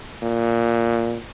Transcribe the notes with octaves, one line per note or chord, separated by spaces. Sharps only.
A#2